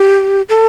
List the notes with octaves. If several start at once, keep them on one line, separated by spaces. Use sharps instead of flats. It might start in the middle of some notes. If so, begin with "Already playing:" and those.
Already playing: G4
A4